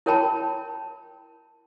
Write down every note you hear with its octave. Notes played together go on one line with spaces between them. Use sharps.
E4 A#4 C#5 G5 A5 B5